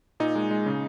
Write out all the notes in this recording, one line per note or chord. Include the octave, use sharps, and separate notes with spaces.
A#2 D#4
G#3
G#3
C#3